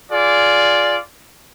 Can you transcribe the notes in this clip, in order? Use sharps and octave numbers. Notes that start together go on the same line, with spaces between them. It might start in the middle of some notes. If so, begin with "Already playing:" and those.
F4 G#4 D5